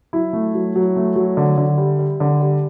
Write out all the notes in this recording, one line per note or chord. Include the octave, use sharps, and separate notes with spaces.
F#3 E4
A3
F#3
F#3
A3
F#3
D3
D3
G3
G3
D3
G3